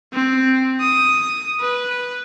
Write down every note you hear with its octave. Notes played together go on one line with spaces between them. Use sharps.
C4
D#6
B4